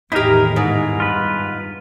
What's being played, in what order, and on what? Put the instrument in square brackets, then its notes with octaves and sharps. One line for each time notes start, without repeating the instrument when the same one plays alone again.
[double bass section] E2 A2 D#3 [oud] D#4 G4 [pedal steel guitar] E4 G#4 A#4
[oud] G#2
[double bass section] G2 [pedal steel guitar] F4 B4